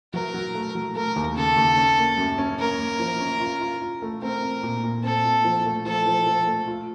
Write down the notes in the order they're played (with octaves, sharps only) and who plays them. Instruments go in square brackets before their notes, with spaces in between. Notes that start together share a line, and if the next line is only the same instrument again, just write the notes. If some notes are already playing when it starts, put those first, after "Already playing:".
[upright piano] F#3 [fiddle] A#4
[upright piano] F#3
A3
F#3
[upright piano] A3 [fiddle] A#4
[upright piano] D#2
[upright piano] C#3 [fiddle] A4
[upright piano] D#2
C#4
A#3
F#2
C#4
[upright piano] A#3 [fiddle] A#4
[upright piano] A#3
F3
C#4
F4
F4
F4
A3
[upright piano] C4 [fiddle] A#4
[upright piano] C4
A#2
A#2
[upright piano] C4 [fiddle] A4
[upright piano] A#2
F3
A3
[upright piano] F3 [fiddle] A4
[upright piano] F3
F3
A3
F4